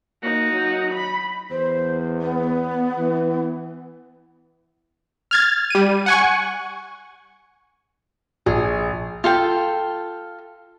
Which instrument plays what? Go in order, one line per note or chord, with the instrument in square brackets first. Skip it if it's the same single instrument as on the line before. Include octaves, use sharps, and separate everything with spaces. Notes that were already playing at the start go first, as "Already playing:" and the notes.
[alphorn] A#3 [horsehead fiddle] D#4 [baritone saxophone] F#4
[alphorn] F#3
[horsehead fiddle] B5
[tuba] E2 [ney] C5
[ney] B3
[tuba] E3
[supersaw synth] F6 G#6 A6
G3 D#7
F#5 G#5 C#6
[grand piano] A#1 [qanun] G#4
[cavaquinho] F4 A4 G5